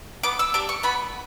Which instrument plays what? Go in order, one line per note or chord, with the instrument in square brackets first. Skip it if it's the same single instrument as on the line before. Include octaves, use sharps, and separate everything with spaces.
[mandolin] B3 D6
E6
D4 G4 D6
C#6
B3 B5